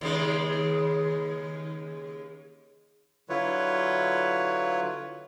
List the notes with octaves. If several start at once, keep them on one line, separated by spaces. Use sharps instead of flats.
D#2 C#3 G#3
D3 F#3 E4 F4 B4 C#5